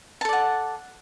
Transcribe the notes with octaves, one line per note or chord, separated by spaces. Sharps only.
A4 D5 F#5 A5